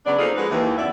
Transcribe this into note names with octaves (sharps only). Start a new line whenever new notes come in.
C#3 F#3 B3 D4 D5
A#3 D#4 F4 G#4 A4 C5
F3 G#3 F#4 B4
D#2 E3
F#2 B3 D5 E5